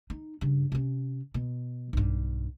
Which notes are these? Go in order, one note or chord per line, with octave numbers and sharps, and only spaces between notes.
D#4
G2 C#3
C3 C#4
B2
B1 G2